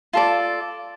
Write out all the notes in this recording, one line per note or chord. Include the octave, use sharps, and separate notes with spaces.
F4 A4 D5